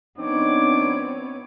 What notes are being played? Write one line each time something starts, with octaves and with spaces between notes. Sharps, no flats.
F3 B3 C4 D4 D#4 C#5 D6